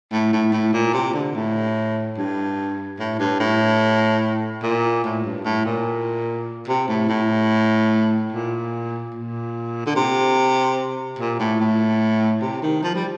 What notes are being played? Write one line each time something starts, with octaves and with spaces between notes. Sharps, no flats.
A2
A2
A2
A#2
C3
D3
A2
G2
A2
G2
A2
A#2
A2
G2
A2
A#2
C3
A2
A2
A#2
A#2
D3
C3
A#2
A2
A2
C3
D#3
F3
G3